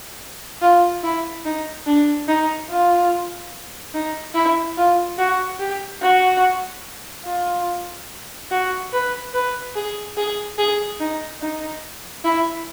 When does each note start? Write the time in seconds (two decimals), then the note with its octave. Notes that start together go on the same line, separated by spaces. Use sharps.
0.62 F4
1.03 E4
1.45 D#4
1.86 D4
2.28 D#4
2.69 F4
3.94 D#4
4.35 E4
4.77 F4
5.18 F#4
5.60 G4
6.02 F#4
7.25 F4
8.51 F#4
8.92 B4
9.33 B4
9.76 G#4
10.17 G#4
10.58 G#4
11.00 D#4
11.41 D#4
12.24 E4